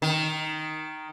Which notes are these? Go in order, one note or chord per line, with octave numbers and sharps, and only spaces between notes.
D#3